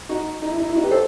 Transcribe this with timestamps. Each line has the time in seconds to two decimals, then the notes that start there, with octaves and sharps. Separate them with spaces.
0.09 D#4 F#4
0.42 D#4
0.51 E4
0.59 D#4
0.68 E4
0.75 D#4 F#4
0.83 G4 B4
0.91 A4 C5